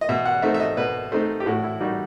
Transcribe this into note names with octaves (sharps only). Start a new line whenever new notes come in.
D#5
B2 E5
F#5
A3 C4 D#4 E5
E5
D#5
B2 B4
A3 C4 D#4 C5
G4
A2 F#4
E4
G3 D#4 F#4